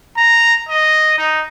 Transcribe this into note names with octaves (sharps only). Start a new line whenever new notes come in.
A#5
D#5
D#4